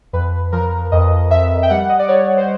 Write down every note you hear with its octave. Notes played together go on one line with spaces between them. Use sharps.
F2 B4
F3 A#4
F2 D#5
F2 E5
G5
G3 F#5
D#5
D5
G3 C#5
C5